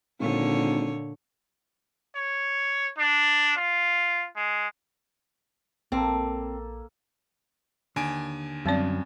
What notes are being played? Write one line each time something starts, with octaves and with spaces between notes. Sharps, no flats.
G#1 A#2 D3 C#5
C#5
D4
F4
G#3
A#1 A#3 C4 A4
D#2 D3 G#5 D7
F#2 G3 C4 D5